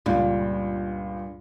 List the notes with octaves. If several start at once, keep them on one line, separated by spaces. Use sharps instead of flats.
C#2 G2 A#2 G3